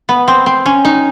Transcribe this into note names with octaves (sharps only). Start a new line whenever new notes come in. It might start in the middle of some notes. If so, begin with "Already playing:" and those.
B3
C4
C4
C#4
D#4